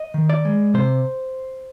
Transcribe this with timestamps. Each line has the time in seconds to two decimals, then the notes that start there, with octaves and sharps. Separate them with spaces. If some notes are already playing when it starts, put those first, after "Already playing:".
Already playing: D#5
0.14 D#3
0.29 D5
0.45 G#3
0.74 C3 C5